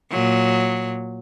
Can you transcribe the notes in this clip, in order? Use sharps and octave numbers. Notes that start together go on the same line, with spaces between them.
A#2 F#3